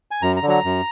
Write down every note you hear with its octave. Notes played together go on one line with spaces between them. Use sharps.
G#5
F#2 A#5
A#5
D3
F#3 A#5
F#2